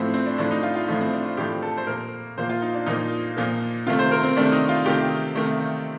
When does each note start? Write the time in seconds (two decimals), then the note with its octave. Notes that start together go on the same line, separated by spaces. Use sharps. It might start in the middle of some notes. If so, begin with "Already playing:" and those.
Already playing: A2 F3 A3 C4
0.14 C4
0.26 D4
0.38 A2 F3 A3 D4
0.51 D#4
0.63 F4
0.75 F4
0.88 A2 F3 A3 D#4
1.01 C4
1.13 D4
1.25 F4
1.37 A2 F3 A3 G4
1.63 A4
1.77 C5
1.87 A#2 F3 A#3 A#4
2.38 A#2 F3 A#3 C5
2.49 F4
2.62 D#4
2.74 D4
2.86 A#2 F3 A#3 D#4
3.37 A#2 F3 A#3
3.86 C3 D#3 A3 F4
3.99 C5
4.11 A#4
4.23 C4
4.37 C3 D#3 A3 D4
4.52 D#4
4.69 F4
4.86 C3 D#3 A3 G4
5.36 C3 D#3 A3